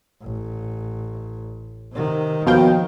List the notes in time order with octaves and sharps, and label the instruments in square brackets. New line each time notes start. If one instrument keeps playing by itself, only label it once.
[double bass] A1
C3 D#3
[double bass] D#2 D#3 [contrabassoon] B2 [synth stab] F3 F5 G5